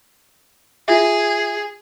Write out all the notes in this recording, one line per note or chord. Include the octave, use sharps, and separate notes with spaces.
F4 G#4 E5